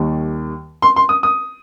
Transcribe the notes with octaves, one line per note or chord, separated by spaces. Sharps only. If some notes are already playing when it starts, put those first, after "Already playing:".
Already playing: D#2 D#3 G3 A#3
C6
C6
D#6
D#6